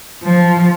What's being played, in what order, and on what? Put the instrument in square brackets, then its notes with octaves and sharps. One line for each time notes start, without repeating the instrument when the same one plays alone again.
[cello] F3